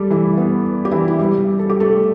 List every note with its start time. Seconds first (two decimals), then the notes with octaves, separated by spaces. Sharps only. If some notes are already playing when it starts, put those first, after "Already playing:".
Already playing: G3 A3 G4 A4
0.10 E3 E4
0.37 B3
0.85 G4
0.91 E3 E4
1.08 E4
1.19 G3 G4
1.59 A4
1.70 G4
1.80 A3 A4